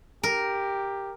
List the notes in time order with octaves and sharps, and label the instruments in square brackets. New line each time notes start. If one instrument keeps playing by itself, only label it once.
[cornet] G4 [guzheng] A#4